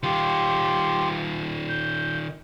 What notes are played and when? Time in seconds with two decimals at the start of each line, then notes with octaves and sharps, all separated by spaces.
0.03 D#3 F4 G4 C6
1.69 G6